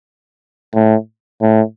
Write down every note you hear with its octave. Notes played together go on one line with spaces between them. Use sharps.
A2
A2